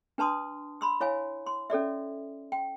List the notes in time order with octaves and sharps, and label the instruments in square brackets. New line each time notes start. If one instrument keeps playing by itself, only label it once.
[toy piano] D4 B4 A5 C6 D#6
B5 C6 E6
E4 C#5 F5 G#5
C6
C#4 A4 D5 E5
G5